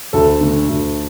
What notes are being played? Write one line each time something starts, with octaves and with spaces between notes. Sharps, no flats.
D2 A4
D3 A3
D2